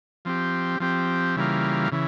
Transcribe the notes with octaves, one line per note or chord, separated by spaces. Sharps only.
F3 C4 G4
F3 C4 G4
C#3 E3 G3 A#3 F4
C#3 E3